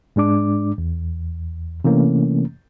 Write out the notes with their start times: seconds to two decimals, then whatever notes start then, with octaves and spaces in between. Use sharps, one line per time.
0.16 G#2 G#3 D4 D6
0.78 E2
1.84 C3 E3 A3 A#3 C#4